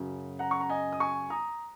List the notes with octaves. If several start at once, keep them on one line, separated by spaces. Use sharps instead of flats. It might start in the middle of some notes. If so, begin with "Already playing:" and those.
Already playing: F#2 C#3 F#3
F#5 A#5
C#6
A#5
D#5 G#5
D#6
G#5 C#6
A#5 D#6